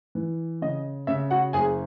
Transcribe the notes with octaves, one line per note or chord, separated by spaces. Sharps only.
E3
C#3 D#5
C#3 E5
F#4 F#5
F#1 G#4 G#5